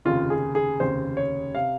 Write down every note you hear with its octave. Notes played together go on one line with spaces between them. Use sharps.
F1 D#2 C#3 F4
G#4
G#4
F1 D#2 C#3 C5
C#5
C3 F5